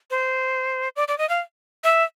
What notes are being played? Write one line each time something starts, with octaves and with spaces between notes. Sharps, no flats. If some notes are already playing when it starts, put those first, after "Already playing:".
C5
D5
D5
D#5
F5
E5